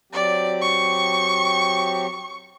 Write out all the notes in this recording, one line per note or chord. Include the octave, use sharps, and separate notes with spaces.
F#3 C4 G4 D5
C#6